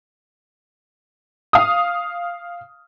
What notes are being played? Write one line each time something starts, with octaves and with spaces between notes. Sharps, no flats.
F5 D#6